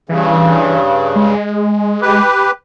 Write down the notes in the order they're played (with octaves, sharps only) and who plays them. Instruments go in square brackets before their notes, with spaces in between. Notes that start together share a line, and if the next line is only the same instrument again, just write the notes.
[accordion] G2 C#3 [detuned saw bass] E3
[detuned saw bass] G#3
[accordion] G4 B4